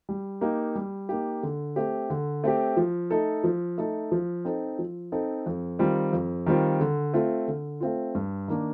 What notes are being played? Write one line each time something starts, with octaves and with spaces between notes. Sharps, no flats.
G3
A#3 D#4 G4
G3
A#3 D#4 G4
D3
A3 C4 G4
D3
A3 C4 G4
F3
A3 D#4 A4
F3
A3 D#4 A4
F3
C4 D#4 A4
F3
C4 D#4 A4
F2
D#3 G3 C4 F4
F2
D#3 G3 C4 F4
D3
A3 C4 F4
D3
A3 C4 F4
G2
D#3 A#3 D4